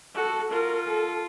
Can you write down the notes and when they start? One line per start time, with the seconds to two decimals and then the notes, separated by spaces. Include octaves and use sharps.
0.15 F#4 A4
0.51 F4 A#4
0.87 A4